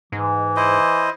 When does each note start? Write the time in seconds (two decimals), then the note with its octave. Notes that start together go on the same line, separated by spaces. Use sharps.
0.12 G#2 E3
0.56 E4 C5 D#5